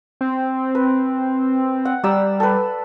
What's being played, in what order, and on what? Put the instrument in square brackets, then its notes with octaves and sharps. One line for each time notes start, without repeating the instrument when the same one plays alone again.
[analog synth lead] C4
[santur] B4
F#5
[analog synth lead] G3 [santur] D5 A#5 E6
[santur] A4 B4